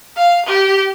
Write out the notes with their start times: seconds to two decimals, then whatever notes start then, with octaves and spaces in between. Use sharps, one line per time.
0.16 F5
0.45 G4